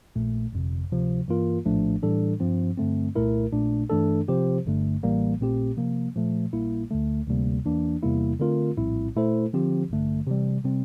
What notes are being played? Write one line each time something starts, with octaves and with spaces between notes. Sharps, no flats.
A#1 A#2 A3
G1 F2 C3
D2 C3 F3
G2 E3 A#3 F4 A#4
A#1 A2 F3 A3 D4
A2 E3 G3 D4 A4
G2 F3 C4
G2 D3 A3 C4
C2 A#2 A3 E4 A#4
A#1 A#2 A3 D4
G2 E3 A3 D4 A4
C3 F3 C4 G4 C5
G1 G2 D3 A3
A1 A2 E3 G3 A#3
A#1 A#2 A3 C4 G4
C3 F3 A#3
A#2 F3 A3
A#1 A#2 G3 A#3 E4
D2 D3 A3
D2 C3 G3 A#3
E2 E3 A#3 D4
E2 C3 G3 A#3 E4
D3 A3 C4 F4 A#4
A#1 A2 G3 C4 E4
A#2 A3 E4 A4 C5
D3 F3 C4 G4
A1 G2 D3 A3
C3 E3 G3
C3 G3 C4